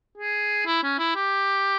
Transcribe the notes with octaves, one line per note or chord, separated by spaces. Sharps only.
G#4
E4
C#4
E4
G4